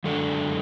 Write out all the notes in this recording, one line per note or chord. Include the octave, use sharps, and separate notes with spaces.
F#2 D3 G#3 D4 A4